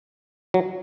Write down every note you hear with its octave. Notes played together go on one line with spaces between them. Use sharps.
F#3